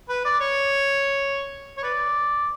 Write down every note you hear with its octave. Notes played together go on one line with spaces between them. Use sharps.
B4
D5
C#5
C#5
B4 D5